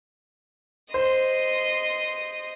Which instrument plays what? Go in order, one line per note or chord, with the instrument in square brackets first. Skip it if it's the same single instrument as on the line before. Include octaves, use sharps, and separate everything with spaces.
[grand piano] C5 [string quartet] D#5 C6